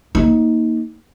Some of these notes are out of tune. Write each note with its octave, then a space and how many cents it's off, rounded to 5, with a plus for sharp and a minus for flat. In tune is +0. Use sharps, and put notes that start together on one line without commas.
A#3 +0 D#4 +20